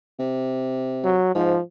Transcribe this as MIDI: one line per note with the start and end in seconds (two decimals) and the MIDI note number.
0.20 1.19 48
1.04 1.31 54
1.35 1.56 44
1.35 1.60 53